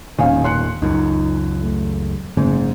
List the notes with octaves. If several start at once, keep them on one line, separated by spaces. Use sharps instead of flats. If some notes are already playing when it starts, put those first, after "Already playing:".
E1 A#2 D#3 C#4 F5 G#5
C6 F#6 C#7
C#2 F#2 D#4
A3
F#1 G#2